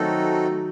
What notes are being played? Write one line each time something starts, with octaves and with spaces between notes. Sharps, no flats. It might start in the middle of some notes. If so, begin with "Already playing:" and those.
Already playing: D#3 F#3 A3 C4 D#4 F#4 A4